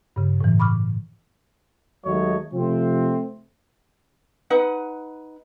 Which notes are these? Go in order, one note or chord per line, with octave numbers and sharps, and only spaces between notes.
G2 C#3
A2 E3
B5 C#6 D6 F6
D#2 F#3 G#3 A3 C#5 D#5
C3 F3 A3 C4
D#4 B4 F#5